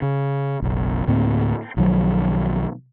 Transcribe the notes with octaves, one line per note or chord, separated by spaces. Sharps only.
C#3
F#1 B1
D2 A2 A#3 C4
B1 D#3 F3 F#3